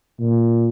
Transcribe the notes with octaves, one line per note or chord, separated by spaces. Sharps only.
A#2